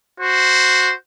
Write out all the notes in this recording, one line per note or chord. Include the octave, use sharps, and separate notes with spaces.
F#4 C5